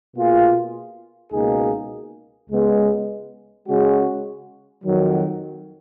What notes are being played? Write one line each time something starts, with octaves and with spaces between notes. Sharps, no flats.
B2 A#3 F4 G#4
C#2 B2 A#3 D#4 G#4
C#2 C#3 G#3 B3
C#3 G#3 C#4 F#4
F2 D#3 F#3